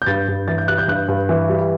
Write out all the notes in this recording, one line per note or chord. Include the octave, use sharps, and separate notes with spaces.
G6
G2 A6
G2
E3 A6
G6
G3 F#6
G6
G2 F#6
G2
E3
G3